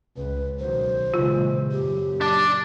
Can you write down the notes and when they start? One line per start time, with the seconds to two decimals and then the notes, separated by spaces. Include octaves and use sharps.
0.17 C#2 B4
0.59 B1 D#3 F#3 C5
1.14 A#2 C#3 E3 G#3 F4
1.72 F#2 A#2 G4
2.21 D4 D5